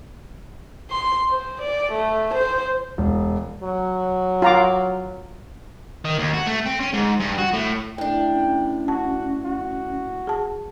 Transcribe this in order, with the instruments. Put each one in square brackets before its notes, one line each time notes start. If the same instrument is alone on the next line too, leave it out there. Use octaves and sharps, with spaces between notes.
[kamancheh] C6
C5
D5
A3
C5
[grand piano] E1
[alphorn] F#3
[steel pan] F4 A#5 D6
[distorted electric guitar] D#3
D#2
F#4
A3
C4
C#4
G#2
G2
F#4
A2
[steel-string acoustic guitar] A2 D4 [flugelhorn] G5
[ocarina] C#4
[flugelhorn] F#4 [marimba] A5
[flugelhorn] F#4
[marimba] G#4 A5